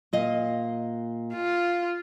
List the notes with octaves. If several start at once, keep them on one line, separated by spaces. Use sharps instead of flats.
A#2 D#5 F5
F4